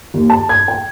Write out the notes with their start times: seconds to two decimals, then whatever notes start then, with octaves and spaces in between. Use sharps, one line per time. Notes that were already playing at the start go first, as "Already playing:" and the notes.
0.14 D#2
0.30 A5
0.49 G#6
0.68 G5